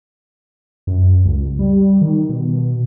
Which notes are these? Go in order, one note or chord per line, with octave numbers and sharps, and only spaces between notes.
F#2
C#2
G3
D#3
B2